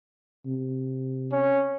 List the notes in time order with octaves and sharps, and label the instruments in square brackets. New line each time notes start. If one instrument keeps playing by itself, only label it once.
[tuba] C3
[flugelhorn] C#4